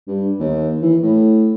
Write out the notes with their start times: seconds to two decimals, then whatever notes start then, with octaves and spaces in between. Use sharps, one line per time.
0.08 G2
0.40 D#2
0.82 E3
1.03 A2